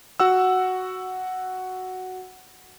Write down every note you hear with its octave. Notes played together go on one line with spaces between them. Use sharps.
F#4 F#5 E6